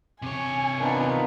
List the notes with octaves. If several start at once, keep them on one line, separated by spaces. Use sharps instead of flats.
C3 C#5 G#5
B3 D4 D#4 F4 A#4